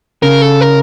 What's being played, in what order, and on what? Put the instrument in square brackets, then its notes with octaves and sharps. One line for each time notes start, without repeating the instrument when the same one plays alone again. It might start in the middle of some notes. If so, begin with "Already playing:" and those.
[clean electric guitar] C#3 [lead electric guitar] A#4
[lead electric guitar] A4
A#4